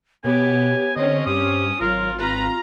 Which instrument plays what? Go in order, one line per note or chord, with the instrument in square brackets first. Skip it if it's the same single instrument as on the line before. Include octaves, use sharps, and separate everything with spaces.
[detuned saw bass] B2 [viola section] B3 G4 [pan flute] C#5 [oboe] G#5
[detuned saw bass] D3 [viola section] C4 C#4 [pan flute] C#5 [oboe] D#5
[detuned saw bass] G2 [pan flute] G4 [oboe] D#6
[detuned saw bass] G#1 [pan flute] F#3 [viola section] F4 [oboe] A#4
[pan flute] C4 [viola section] F4 A#5 [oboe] B4